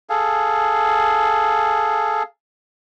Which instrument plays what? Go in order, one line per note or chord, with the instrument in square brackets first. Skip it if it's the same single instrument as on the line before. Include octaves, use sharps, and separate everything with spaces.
[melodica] G#4 A4 F5